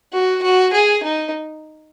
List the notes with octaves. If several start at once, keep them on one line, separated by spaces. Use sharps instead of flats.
F#4
F#4
G#4
D#4